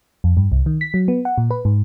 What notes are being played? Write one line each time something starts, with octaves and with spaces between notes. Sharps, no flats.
F2
G2
C2
D#3
B6
F#3
B3
F#5
A#2
B4
G#2